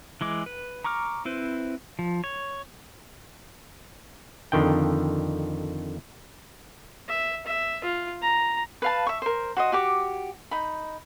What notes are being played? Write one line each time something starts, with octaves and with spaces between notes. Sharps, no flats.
E3 G#3 D6
B4
A#5 C#6 D6 F6
C4 E4 B4 C5
F3
C#5
F2 D3 D#3 G5
E5
E5
F4
A#5
B4 F5 A5
E5 C#6
A#4 C5
F#4 C5 D#5
F#4 G4 D6
D#4 B5